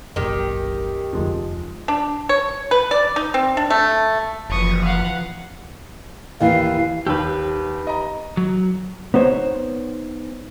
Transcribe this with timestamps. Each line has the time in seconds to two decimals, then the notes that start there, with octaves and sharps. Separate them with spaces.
0.16 F#1 B1 F#2 A#2 D#3 G4
1.13 F1 D2 F3 G#3 D#4
1.88 D4
2.29 C#5
2.71 B4
2.91 D5
3.16 D#4
3.34 C4
3.57 D4
3.70 A3
4.50 F#1 E3 F3 B4 C#6 D#6
4.84 F5 F#5
6.40 D#2 E3 E4 F5
7.07 D#2 G4 B4 E6
7.87 D#5 A#5
8.37 F#3
9.14 B3 D#4 C5 C#5